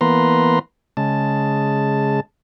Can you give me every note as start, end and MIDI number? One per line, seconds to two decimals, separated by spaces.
0.01 0.59 52
0.01 0.59 58
0.01 0.59 59
0.01 0.59 71
0.01 0.59 82
0.01 0.59 84
0.97 2.20 49
0.97 2.20 56
0.97 2.20 81